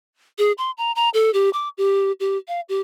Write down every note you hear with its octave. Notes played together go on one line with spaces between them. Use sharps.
G#4
C6
A#5
A#5
A4
G4
D6
G4
G4
F5
G4